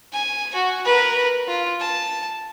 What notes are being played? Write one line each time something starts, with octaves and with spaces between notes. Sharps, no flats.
G#5
F#4
A#4 B4
F4
A5